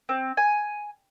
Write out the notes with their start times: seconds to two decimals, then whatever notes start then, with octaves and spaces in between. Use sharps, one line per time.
0.09 C4
0.37 G#5